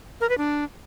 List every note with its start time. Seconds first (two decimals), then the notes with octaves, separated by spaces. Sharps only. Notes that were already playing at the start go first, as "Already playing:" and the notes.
0.21 A#4
0.29 B4
0.38 D4